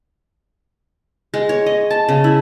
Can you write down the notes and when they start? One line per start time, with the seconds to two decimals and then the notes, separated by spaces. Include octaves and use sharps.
1.34 G#3
1.49 C#5
1.66 D#5
1.90 A5
2.09 C#3
2.24 E4